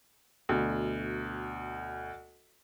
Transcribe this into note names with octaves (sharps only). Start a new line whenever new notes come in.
D2 B2